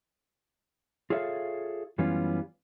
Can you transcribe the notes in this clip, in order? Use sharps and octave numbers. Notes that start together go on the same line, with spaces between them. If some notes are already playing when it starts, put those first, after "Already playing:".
F4 G#4 A4 C#5 E5 F5
F#2 E3 G3 B3 C#4 F4